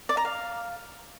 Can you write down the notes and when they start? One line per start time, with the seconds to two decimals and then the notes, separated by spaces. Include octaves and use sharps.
0.09 D5
0.17 A#5
0.25 F5